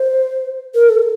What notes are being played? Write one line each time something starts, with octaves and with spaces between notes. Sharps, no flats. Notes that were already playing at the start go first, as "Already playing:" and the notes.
Already playing: C5
A#4
A4